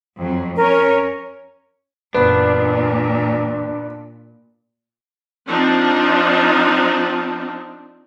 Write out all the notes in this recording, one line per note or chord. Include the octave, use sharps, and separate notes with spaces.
F2 F#3
C#4 A#4 C#5
F#1 E2 A#2 B3 D4
F3 C4 D4 D#4